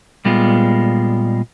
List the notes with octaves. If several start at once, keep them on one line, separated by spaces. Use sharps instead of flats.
A#2 G3 G#3 B3 F4